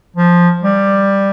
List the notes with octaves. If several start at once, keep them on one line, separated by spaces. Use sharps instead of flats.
F3
G3